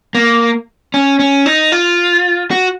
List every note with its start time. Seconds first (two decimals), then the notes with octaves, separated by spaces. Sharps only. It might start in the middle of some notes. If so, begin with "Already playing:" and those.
0.15 A#3
0.94 C#4
1.19 C#4
1.46 D#4
1.72 F4
2.51 F#4